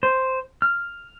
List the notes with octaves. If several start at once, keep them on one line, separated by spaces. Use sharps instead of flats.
C5
F6